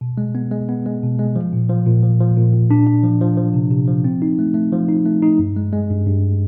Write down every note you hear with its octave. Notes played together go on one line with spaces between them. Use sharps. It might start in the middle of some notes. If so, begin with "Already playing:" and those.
B2
G#3
B3
G#3
B3
G#3
B2
G#3
F3
A#2
F3
A#2
F3
F3
A#2
A#2
D4
D4
F3
F3
F3
C3
C3
F3
C4
D#4
A3
A3
F3
D#4
A3
D#4
G2
G#3
G#3
G2
G2